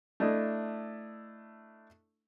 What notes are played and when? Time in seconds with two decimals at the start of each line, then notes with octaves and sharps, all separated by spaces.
0.20 A3 D4 E4 D#5